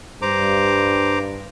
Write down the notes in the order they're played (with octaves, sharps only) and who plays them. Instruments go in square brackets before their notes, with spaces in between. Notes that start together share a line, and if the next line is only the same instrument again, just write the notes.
[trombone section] G2 [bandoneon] C5 A#5 D6